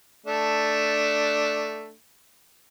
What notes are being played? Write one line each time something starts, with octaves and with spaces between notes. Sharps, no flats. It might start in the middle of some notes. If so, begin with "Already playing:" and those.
A3 D4